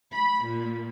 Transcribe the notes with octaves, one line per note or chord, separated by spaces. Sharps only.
B5
A#2